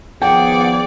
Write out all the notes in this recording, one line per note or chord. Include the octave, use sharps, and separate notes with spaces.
D#3 F3 B3 G#4 D5 F#5 G5